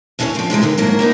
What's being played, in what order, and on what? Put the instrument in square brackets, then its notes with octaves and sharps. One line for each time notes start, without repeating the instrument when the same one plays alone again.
[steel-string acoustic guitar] E2 D3 E3 G3 C#4 C#5
F3 C4
C3 E3 F3 G#3
E2 D3 D#3
F2 G#2 F#3 A#3 A#4
A#3 B3 D#4 B4